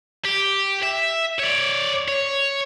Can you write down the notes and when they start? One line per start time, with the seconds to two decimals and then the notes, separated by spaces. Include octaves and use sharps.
0.25 G4
0.83 E5
1.39 C#5 D5
2.08 C#5